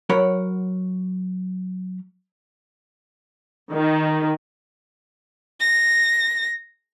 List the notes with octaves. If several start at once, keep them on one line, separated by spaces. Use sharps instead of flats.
F#3 A#4 C#5 F#5 B5
D#3
A#6